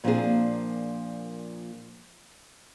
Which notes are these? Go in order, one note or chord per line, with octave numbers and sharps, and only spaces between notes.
A#2 F3 A#3 C4 D4 G#4